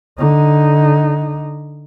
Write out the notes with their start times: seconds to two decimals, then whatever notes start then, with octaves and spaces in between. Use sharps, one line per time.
0.18 D3 D#4